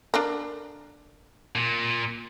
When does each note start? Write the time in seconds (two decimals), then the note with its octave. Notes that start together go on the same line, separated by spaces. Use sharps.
0.14 D4 A4 A#4
1.55 A#2